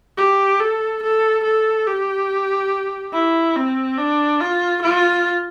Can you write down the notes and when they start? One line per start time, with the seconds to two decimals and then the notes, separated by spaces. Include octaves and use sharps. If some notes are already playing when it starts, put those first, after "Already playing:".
0.17 G4
0.60 A4
1.03 A4
1.44 A4
1.87 G4
3.13 E4
3.56 C4
3.98 D4
4.40 F4
4.82 F4